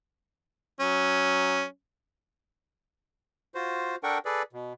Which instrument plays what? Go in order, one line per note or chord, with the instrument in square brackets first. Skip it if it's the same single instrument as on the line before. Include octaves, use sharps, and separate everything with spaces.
[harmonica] F#3 C#4
[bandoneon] F4 F#4 C5
D4 A4 A#4 F#5 G5 C#6
G#4 A4 B4 D5
B2